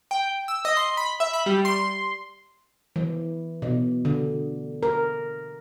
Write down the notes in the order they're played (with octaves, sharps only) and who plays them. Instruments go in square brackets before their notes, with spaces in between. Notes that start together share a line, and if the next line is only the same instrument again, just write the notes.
[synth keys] G5
E6
D#5
C6
B5
E5
B5
G3
C6
[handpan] E3
B2
D3
A#4